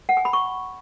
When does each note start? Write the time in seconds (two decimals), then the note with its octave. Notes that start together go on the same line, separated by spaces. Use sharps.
0.09 F#5
0.17 G#5
0.25 B5
0.33 C#6